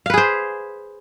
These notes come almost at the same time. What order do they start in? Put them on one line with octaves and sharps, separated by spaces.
F5 B4 G#4 C5